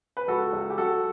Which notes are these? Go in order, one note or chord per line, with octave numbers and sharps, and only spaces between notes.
B4
C#2 F#4 A4
C#2
G4
F#3 F#4 A4